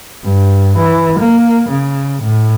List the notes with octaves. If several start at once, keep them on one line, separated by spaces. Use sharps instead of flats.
G2
E3
A#3
C#3
A2